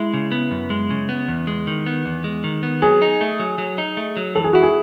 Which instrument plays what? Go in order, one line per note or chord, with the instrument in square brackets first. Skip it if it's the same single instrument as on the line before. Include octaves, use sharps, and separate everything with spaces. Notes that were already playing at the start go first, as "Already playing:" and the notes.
Already playing: [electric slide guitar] G#3 [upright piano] E4
[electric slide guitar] C#3
B3
F#2
G#3
C#3
B3
E2
G#3
D#3
B3
E2
G#3
D#3
B3
[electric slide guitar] F#3 [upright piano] G#4
[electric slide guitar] D#4
A3
F#3
F#3
D#4
A3
F#3
[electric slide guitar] E3 [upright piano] A4
[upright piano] G#4
[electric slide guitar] E4 [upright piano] F#4
[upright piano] G#4